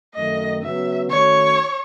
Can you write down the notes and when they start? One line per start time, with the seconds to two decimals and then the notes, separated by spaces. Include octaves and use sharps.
0.15 F#2 D#3 A3 D#5
0.63 C#3 F#3 B3 F#4 E5
1.10 D#3 A3 C#4 F#4 C#5